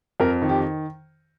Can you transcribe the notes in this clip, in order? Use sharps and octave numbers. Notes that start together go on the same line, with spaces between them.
F2 A#4
D#3
G4